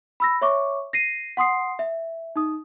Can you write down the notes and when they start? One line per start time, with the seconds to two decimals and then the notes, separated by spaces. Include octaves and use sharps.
0.20 B5 E6 A#6
0.42 C#5 E5 C#6 D6
0.93 A#6 C7 D#7
1.37 F#5 C6 D#6 C7
1.79 E5
2.36 D#4 D#6